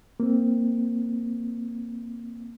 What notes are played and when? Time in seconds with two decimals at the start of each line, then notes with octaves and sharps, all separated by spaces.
0.20 A#3 C4